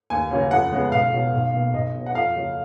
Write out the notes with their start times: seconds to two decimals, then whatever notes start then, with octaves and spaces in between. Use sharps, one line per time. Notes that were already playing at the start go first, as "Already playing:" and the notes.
0.10 D#2 G#5
0.31 C#3 F#3 A#3
0.51 F2 F#5
0.72 C#3 G#3 B3
0.92 B1 F5
1.13 B2 F#3
1.33 B1
1.54 B2 A#3
1.74 B1 D#5
1.95 B2 F#3
2.06 F#5
2.15 F2 F5
2.35 C#3 F#3 A#3